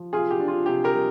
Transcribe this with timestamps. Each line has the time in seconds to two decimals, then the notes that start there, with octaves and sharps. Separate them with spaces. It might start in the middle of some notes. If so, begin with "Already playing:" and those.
Already playing: F3
0.13 C3 F4 G#4
0.31 G4
0.40 D4
0.48 F4
0.66 C3 G4
0.84 G4 A#4
0.93 G3